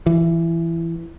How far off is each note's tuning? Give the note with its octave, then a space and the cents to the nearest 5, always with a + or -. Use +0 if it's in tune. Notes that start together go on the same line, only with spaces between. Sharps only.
E3 +15